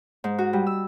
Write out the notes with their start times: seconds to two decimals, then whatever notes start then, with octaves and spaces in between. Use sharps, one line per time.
0.24 G#2
0.38 F#4
0.53 G3
0.67 E6